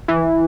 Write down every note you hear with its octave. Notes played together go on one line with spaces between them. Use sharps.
E3